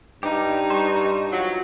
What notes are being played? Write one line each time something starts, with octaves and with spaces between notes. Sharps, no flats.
G2 G3 D#4 G4
G3 C5 C#6
F3 F#3